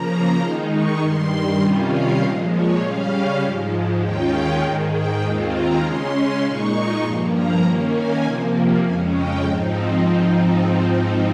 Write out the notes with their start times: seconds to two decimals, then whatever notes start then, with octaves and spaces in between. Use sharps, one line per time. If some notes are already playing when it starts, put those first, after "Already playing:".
Already playing: C#3 F3 A#3 A#5
0.40 D#3 G#3 D#4 C6
0.70 C#6
1.01 G2 D#3 G3 C6
1.60 C3 D#3 G3 C#4 F4
1.90 F5
2.20 A#2 F3 G#3 D#5
2.51 C#5
2.81 C#3 G3 C#4 F5
3.41 G#2 F3 G#3
4.01 D#2 D#3 G#3 C#4 F4 G5
4.61 G#2 D#3 G#3
4.91 G5
5.21 D#2 D#3 G#3 C4 F4
5.52 A#5
5.82 C#3 G#3 C#4 C6
6.42 A#2 G#3 D#4 C#6
7.02 G2 F3 A#3 C6
7.33 A#5
7.62 D#3 A#3 C#4
7.93 G#5
8.23 C3 F3 A#3 C6
8.83 F2 C#3 G#3 C#4 G#5
9.13 G5
9.43 G#2 F3 C4 D#4 D#5